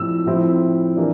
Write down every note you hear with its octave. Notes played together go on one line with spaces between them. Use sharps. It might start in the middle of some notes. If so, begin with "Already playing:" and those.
Already playing: A2 F3 C4 E4 E6
A2 F3 C4 E4
E3 A#3 D4